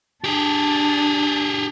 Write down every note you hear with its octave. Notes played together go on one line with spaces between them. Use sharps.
D4 G4 G#4